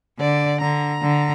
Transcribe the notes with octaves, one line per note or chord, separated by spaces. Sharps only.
D3 D5
D3 A#5
D3